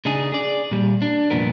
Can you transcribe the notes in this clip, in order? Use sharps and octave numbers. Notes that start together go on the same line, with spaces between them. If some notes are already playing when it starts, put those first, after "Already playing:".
C#3 D4 D#4 G#4
G#4 D5
A#2 G3
D4
C2 F2 A#2 B3 A#4